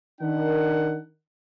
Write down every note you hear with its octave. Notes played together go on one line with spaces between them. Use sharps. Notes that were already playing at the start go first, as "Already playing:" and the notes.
D#3 D4 A#4 F#5